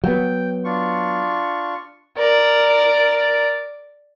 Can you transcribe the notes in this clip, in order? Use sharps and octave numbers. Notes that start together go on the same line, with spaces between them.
F#3 B3 G5
D4 F4 C#6
A#4 D5